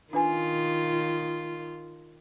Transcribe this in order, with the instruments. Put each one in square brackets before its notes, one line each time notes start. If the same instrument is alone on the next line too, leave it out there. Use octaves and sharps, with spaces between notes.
[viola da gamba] D#3 F4 [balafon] D4 B4 G#5